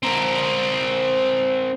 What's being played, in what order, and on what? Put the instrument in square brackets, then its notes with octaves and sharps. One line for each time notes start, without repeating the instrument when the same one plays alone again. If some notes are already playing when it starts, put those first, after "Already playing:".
[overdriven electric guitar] C4 A#4